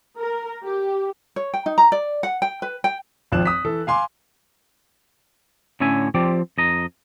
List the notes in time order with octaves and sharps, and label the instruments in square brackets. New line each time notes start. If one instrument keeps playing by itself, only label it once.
[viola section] A#4
G4
[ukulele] C#5
G5
D#4
A#5
D5
F#5
G5
B4
G5
[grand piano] G#1 F2 F3 F#6 E7
D#6 B6
E3 A4
F5 G#5 C6 D6
[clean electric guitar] A2 D3 C#4 E5 G#5
F3 C4 G4 D5
F2 D#5 A#5